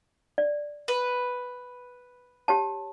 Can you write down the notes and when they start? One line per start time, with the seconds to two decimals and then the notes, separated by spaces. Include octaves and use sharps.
0.38 D5
0.88 B4
2.48 G4 C#5 A5